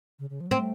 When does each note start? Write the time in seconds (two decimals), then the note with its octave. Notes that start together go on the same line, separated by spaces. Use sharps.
0.19 C#3
0.30 C#3
0.41 F3
0.47 F#3
0.51 A3 C4